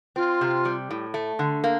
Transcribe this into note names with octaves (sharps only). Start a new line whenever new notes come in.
C4 F4
C3
G3
A2
A3
D3
A#3